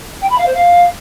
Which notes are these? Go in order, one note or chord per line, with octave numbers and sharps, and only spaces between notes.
G5
B5
F5
C5
F5